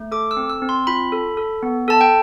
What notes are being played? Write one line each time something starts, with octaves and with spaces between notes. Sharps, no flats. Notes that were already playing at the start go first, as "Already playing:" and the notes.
Already playing: A3
A4 D6
E6
C4
E6
C4
C6
F4 B5
A4
A4
B3
A4 A5
G5